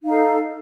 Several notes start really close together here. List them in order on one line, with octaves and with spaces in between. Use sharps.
D#4 F5 A4